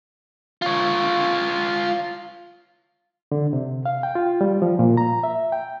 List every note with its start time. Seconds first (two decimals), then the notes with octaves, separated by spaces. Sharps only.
0.62 F4 C#5
3.32 D3
3.53 C3
3.86 F5
4.03 G5
4.15 F4
4.41 G3
4.62 F3
4.79 A#2
4.97 A#5
5.23 E5
5.52 G5